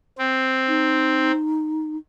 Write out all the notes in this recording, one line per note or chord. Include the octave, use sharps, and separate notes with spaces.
C4
D#4